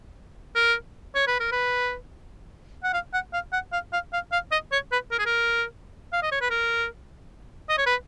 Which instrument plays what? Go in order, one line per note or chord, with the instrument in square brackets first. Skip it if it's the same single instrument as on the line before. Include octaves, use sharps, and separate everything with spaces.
[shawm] A#4
C#5
B4
A#4
B4
F#5
F5
F#5
F5
F#5
F5
F5
F5
F5
D#5
C#5
B4
A#4
G#4
A#4
F5
D#5
C#5
B4
A#4
D#5
C#5
B4